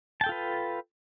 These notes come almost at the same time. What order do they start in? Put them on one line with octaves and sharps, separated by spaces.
A5 G5 A4 F4 B4